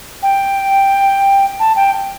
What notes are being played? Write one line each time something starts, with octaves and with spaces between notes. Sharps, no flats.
G5
A5
G5